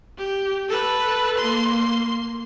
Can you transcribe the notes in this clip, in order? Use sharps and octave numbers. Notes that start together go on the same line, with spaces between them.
G4
A4 B4
A#3 C6